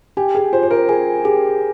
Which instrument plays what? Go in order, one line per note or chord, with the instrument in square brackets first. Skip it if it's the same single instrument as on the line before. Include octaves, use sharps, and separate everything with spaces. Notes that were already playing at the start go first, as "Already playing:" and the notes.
[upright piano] G4 [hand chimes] G#5
[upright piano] G#4
[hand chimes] F4 [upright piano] C5
[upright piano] C5
A#4
[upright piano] G#4 [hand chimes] G#5
[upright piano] G4 [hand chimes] G#4